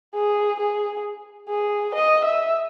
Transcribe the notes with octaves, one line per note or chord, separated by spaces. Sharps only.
G#4
G#4
G#4
D#5
E5